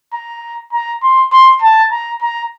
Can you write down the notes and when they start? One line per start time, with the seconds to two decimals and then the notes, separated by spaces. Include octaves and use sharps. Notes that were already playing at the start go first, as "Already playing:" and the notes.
0.14 A#5
0.73 A#5
1.03 C6
1.32 C6
1.62 A5
1.91 A#5
2.22 A#5